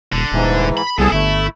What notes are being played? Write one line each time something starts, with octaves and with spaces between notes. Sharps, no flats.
D#1 D3
D#1 G#2 E3
B5
C2 B3 C4 G#4 A4 A5
G1 A3 E4